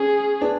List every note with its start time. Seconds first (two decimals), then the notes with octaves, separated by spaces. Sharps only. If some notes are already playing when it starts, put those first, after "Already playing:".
Already playing: C#4 G#4
0.41 B3 D4